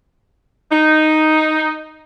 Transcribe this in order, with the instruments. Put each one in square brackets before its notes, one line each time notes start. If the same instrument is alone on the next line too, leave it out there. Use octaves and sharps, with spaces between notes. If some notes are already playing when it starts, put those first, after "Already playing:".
[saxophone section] D#4